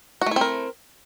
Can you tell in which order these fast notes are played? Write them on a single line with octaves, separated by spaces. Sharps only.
F#4 A3 E4 C4 A#4